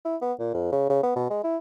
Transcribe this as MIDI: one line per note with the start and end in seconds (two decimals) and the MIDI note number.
0.05 0.16 64
0.22 0.33 59
0.39 0.52 46
0.54 0.70 41
0.72 0.87 49
0.89 0.99 49
1.03 1.13 59
1.16 1.26 47
1.30 1.42 56
1.44 1.57 64